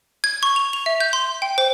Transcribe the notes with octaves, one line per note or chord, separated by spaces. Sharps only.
G#6
C#6
F7
F7
E5
G6
C6
G5
C5